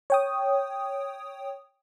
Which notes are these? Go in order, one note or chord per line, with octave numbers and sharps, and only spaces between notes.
C#5 G5 D#6